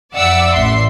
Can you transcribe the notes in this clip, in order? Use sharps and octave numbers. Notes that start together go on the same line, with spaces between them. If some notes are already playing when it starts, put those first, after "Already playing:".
F2 D5 E5 F#5 E6
A1 E5 C6